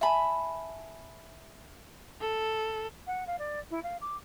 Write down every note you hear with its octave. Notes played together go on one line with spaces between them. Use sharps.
E5 G#5 A5 B5
A4
F#5
F5
D5
E4
F5
D6